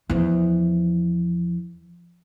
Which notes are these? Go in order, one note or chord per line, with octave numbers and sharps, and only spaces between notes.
E2 F3